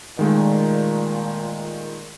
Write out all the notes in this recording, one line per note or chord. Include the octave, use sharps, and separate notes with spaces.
A#2 D#3 G#3 A3